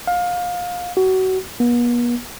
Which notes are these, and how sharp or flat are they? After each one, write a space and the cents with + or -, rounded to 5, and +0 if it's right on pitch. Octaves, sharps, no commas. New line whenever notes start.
F5 +25
F#4 +25
B3 -45